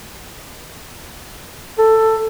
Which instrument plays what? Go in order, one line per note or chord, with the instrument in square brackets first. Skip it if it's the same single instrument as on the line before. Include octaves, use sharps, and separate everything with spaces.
[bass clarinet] A4